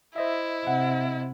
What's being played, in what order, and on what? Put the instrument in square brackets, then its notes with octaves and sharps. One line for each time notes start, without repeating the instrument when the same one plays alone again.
[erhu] E4 [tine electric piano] C5 D#5 E5
[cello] C3 [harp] F#5